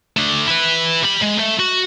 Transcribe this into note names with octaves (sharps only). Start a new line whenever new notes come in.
A3 D4
E4 B4
G3 B5
G#3
A3
F#4